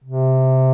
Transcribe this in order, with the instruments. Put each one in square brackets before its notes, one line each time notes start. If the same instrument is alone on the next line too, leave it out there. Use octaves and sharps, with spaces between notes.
[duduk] C3